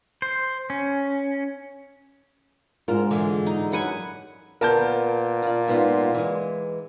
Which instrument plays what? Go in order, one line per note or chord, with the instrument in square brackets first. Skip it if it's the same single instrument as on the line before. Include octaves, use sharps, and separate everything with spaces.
[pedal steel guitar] C5
C#4
[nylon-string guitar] G#2 D4 F4 [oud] A#4
[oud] D3 E3 G#3
[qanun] D#4
[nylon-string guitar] F#2 [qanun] B4 F#5 G#5
[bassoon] A#2 [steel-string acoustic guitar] B3 [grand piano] A#4 A5 G6
[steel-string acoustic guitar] F4 D5
G#2 B3 F4
E3 G#3